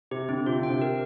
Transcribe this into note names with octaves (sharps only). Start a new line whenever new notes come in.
C3 G4
D3 C4
C3 F4
D3
G5
C3
A#4